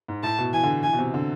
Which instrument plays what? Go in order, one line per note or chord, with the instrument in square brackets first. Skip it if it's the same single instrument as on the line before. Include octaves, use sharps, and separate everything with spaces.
[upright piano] G#2
[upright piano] A2 [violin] A5
[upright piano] B2
[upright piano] E3 [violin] G#5
[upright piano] D3
[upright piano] E3 [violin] G#5
[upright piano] B2
C3
D3